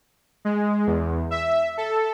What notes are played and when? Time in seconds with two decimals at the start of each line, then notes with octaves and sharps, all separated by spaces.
0.45 G#3
0.87 E2
1.31 E5
1.77 A4